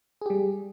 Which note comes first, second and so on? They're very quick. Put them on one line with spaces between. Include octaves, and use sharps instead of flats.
G#4 G4 G3